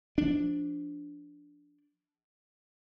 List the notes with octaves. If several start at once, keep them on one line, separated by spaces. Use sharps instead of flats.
F3 D4